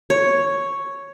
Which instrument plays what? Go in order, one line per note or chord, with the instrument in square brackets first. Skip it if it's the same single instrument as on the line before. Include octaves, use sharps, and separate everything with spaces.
[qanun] C#5